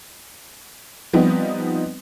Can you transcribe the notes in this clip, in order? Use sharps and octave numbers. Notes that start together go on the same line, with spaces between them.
F3 G3 B3 C4 D#4